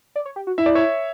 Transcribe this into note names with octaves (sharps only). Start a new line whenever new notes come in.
D5
C#5
G4
F#4
E4 E5
D5
C#5 E5